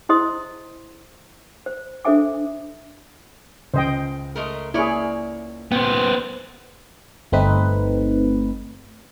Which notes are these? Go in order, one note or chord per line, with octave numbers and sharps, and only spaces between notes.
E4 G#4 C5 D#5 C6 D#6
C5
D4 A4 C5 E5 G#5 D6
C#2 C5 D#5 G5
G#3 A3 A#4
A#3 E4 G#4 C#5 D5
A#2 B3 C5 G5
G1 A3 C4 D#4 B4